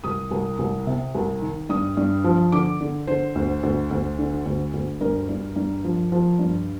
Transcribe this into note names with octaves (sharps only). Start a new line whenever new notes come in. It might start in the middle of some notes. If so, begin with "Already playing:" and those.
C2 D#6
C2
C2
C3
C2
D#3
G2 D#6
G2
F3
D3 D6
D3
D3 C5
D2
D2
D2
D3
D2
D2
G2 A#4
G2
G2
F3
F3
G2